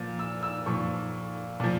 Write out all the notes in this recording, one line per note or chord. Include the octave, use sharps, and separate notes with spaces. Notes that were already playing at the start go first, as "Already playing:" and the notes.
Already playing: A#2 F3
E6
E6
A#2 F3 C#6
A#2 F3